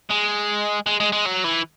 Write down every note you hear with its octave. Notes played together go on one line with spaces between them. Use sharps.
G#3
G#3
G#3
G#3
F#3
E3